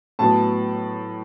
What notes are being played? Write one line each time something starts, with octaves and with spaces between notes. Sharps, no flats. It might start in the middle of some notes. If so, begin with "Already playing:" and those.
A2 F#3 B3 A5